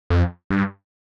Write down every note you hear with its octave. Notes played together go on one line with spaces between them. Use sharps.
F2
G2